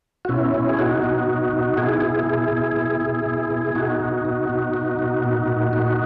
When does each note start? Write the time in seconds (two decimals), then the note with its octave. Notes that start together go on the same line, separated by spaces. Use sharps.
0.25 F#4
0.29 B2 C#4 E4
0.54 B2
0.69 G#4
0.79 B2 D#4 F#4
1.04 B2
1.28 B2
1.53 B2
1.77 B2 E4 G#4
2.02 B2
2.27 B2
2.52 B2
2.76 B2
3.01 B2
3.26 B2
3.50 B2
3.67 E4
3.75 B2 D#4 F#4
4.00 B2
4.25 B2
4.49 B2
4.74 B2
4.99 B2
5.24 A#2
5.48 A#2
5.73 A#2 D#4 F#4